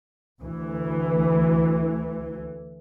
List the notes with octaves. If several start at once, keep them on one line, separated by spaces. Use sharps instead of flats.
D2 E3